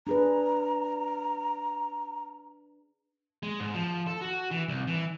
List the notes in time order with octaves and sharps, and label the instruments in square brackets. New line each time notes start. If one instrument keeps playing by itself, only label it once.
[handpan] D4 G#4 B4 [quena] A#5
[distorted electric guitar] G#3
G#2
F3
A4
F#4
E3
C2
E3